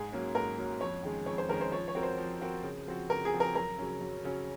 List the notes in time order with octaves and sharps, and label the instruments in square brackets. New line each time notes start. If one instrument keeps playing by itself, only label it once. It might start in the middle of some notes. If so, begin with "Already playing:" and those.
Already playing: [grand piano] G#2 [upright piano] G#4
[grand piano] F#3 A#3 C#4
[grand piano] G#2 [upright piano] A#4
[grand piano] F#3 A#3 C#4
[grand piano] F2 [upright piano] C#5
[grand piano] D#3 G#3 C#4 G#4
[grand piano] F2 [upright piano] C#5
[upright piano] C5
[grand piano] D#3 G#3 C#4 G#4 [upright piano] A#4
[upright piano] C5
[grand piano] F3 [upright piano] C#5
[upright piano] C#5
[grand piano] C4 F#4 A#4
[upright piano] C5
[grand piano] F3
C4 F#4 A#4
C#3
F3 C4 F#4
[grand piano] C#3 [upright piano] A#4
[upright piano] G#4
[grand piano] F3 C4 F#4
[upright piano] A#4
[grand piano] F#2 [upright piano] A#4
[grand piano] C#3 F#3 C#4
F#2
C#3 F#3 C#4